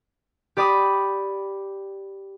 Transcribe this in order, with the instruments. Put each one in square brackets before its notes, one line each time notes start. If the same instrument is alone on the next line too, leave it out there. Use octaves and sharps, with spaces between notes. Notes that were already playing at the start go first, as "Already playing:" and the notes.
[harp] G4 D5 B5 D6 D#6